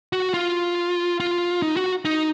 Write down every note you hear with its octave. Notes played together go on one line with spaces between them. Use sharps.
F#4
F4
F4
D#4
F#4
D#4